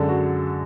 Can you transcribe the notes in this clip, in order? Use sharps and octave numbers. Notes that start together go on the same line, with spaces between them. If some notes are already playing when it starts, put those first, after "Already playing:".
Already playing: F#2 D3 G#3 A4
F#4